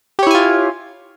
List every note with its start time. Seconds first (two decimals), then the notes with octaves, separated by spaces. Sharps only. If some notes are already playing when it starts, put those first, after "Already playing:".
0.19 G4
0.23 C#5
0.27 E4
0.31 G#5
0.35 F4